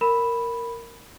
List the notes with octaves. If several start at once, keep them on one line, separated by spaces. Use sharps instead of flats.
A#4 B5 E7